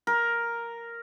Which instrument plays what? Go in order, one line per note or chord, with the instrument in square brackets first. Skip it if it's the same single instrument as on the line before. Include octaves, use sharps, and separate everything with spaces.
[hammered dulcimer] A#4